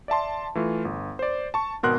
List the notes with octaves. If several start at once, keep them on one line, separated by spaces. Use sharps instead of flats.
D5 E5 A5 C6
E3 A3 F4
G1
C5 D5
A5 C#6
G#1 B2 A#4 F#5 C6 F#6